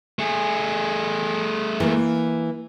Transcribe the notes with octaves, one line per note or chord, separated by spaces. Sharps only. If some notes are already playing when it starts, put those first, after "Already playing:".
A3 G#4
E3 A#3